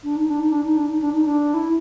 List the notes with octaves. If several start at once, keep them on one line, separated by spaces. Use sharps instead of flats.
D4
D#4
D4
D#4
D4
D#4
D4
D#4
D4
D#4
D4
E4